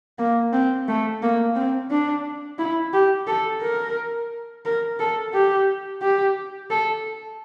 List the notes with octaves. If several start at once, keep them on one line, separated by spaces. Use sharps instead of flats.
A#3
C4
A3
A#3
C4
D4
E4
G4
A4
A#4
A#4
A4
G4
G4
A4